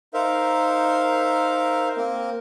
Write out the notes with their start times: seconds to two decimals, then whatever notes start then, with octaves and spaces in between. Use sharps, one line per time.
0.14 D#4 A#4 C5 E5 F5
1.97 A#3 C4 A#4